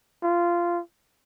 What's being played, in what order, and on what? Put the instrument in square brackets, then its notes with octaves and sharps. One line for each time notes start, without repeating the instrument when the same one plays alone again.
[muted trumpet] F4